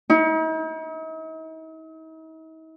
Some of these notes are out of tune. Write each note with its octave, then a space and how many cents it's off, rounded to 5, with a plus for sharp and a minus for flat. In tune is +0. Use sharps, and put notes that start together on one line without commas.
D#4 +45